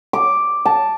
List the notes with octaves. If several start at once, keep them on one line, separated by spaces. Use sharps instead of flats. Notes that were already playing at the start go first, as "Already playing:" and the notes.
D6
A5